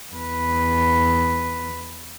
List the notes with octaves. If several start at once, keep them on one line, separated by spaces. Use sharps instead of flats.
E2 B4